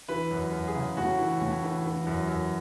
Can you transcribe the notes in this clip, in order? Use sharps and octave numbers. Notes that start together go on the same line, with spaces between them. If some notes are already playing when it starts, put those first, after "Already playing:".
E3 B4
F#2
F#2
G#4
C#3
A2 F#4
E3
A2
E3
E3
F#2
F#2